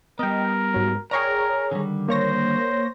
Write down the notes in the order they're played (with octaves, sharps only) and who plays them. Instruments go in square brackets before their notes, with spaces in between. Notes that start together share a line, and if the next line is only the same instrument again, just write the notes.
[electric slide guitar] G3 B3 [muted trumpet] A#4 [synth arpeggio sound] D#5 G5
[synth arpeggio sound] G#2 F#3
[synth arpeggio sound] G#4 C#5 A#5 [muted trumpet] A#4 [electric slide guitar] D5 G5
[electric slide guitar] D3 D#3 G3
[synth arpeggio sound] A#3 C#5 A#6 [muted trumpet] C5